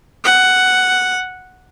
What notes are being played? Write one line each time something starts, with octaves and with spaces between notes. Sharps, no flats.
F#5